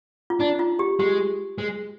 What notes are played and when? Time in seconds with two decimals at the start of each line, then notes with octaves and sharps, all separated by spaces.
0.30 F4
0.40 D4 D#4
0.59 F4
0.79 G4
1.00 G#3 G4
1.58 G#3